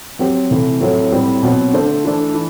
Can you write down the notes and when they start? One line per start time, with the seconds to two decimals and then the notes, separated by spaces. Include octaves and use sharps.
0.19 F#3 C4 G4
0.51 C3 E3 A3
0.81 A2 F#3 A3 C4
1.12 A2 G3 C4
1.43 B2 F#3 C4
1.73 D3 A3 D4 A4 C5
2.04 E3 A3 D4 A4
2.34 E3